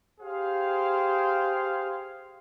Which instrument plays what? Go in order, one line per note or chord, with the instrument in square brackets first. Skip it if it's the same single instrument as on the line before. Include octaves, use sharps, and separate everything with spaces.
[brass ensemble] G4 G#4 C5 F5